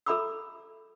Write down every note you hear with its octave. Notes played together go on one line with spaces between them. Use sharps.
A4 E5 A#5 B5 D6 E6